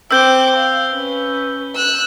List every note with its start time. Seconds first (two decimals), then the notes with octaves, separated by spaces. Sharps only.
0.11 C4 D6 E6 G6 G7
0.57 F5
0.91 C#4 B4
1.75 E6 F#6